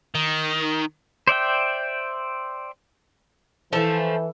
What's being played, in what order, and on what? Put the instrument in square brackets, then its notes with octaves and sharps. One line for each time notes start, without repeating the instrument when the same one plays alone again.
[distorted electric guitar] D#3
[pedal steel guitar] C5 D5 E5 G5
[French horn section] E3 [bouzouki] F3 A3 [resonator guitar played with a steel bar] A4